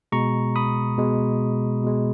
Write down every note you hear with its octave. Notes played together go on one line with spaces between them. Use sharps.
B2 G#3 A#5 C#6
B5 D#6
B2 G#3
B2 G#3